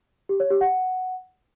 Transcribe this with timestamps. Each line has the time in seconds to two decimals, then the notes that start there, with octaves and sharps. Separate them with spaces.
0.29 G4
0.40 C#5
0.50 G4
0.61 F#5